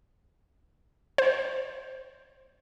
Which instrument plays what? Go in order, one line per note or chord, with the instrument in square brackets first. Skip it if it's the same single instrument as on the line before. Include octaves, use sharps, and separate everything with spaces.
[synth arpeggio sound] C5